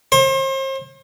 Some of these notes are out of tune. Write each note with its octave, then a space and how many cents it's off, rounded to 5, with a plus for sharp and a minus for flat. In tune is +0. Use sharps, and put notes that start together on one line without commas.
C5 +40